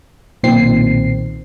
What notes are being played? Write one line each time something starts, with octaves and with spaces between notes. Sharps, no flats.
B1 A#2 D#3 C4 C7